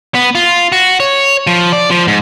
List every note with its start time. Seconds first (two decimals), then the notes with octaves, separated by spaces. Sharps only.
0.15 B3
0.35 F4
0.72 F#4
1.00 C#5
1.47 F3
1.72 D5
1.91 F3
2.08 G#2